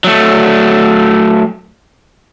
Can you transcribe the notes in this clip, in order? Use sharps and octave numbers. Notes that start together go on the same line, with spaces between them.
F#3 A3